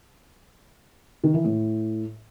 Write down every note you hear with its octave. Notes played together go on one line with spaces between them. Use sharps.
D#3
E3
A2